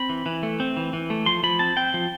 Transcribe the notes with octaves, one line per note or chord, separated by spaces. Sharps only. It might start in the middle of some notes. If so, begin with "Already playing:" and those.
Already playing: C4 B5
E3
E3
A3
C4
E3
E3
A3
F3 C6
F3 B5
C4 A5
C4 G5
F3